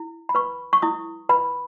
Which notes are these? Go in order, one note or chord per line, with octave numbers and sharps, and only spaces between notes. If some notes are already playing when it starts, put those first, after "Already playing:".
Already playing: E4
B5
B4 C#6
C#6
E4 D#6
B4 B5